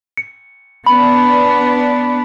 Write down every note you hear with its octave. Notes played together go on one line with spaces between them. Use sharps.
C#7
B3 D4 B5